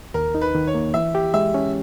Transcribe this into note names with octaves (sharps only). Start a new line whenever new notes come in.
D#2 A#4
D#4
B4
D#3
C#5
A#3
E3 E5
G4
G#3 E5
C#4